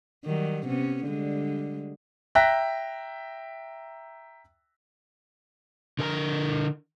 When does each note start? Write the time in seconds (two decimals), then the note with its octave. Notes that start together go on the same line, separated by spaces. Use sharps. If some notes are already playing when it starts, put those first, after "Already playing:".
0.25 D#3 F#3 G3
0.67 C3 B3 C#4
1.05 D3 G3 G#3
2.35 E5 G5 A#5 F#6 A#6 B6
5.99 D3 A#4 G#5 A#5